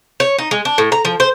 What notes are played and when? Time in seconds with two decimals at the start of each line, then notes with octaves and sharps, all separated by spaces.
0.20 C#5
0.39 D#4
0.51 G#3
0.65 D4
0.78 A2
0.92 A#5
1.05 F3
1.20 C5